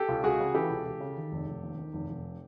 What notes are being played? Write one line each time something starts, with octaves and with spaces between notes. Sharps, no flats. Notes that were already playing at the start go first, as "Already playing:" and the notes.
Already playing: G4 A4
C#2
C#2 F#4 G#4
C#3
E3 G4 A4
C#2
C#2
C#3
D#3
F1
F1
D#2
D#3
F1
F1